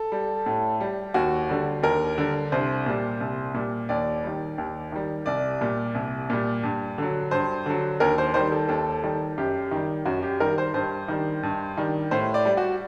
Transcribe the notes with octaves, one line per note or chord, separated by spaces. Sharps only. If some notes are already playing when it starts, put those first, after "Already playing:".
Already playing: A4
G3
A2
G3
D#2 F#4
D3 G3
D#2 A#4
D3 G3
C2 C5
A#2 G3
C2
A#2 G3
D#2 D5
D#3 G3
D#2
D#3 G3
C2 D5
A#2 G3
C2
A#2 G3
G2
D3 F#3
G2 C5
D3 F#3
D#2 A#4
C5
D#3 G3 C5
A4
D#2 A4
D#3 G3
F#2 G4
D#3 G3
F#2 F#4
G4
D#3 G3 A#4
C5
G2 C5
D#3 G3
G2
D#3 G3
A2 C5
D5
G3
F#4